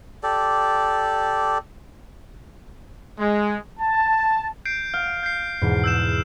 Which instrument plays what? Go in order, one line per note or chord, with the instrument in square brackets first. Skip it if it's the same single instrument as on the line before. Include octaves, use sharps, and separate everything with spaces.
[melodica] G4 A4 D5
[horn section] G#3
A5
[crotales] G6 C7 D7
[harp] F5 [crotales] F6
[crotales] G6 C7
[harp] E2 G#2 B2
[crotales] E6 G6 E7